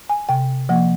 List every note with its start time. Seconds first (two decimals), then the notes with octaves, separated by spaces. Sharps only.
0.10 G#5
0.29 C3 G5
0.69 F3 A#3 F#5